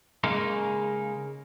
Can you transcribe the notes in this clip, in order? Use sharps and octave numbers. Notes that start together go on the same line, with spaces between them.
C#3 G#3 A#3 D#4